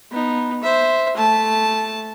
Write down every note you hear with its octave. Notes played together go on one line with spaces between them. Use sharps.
B3 D#4
C5 E5
A3 A5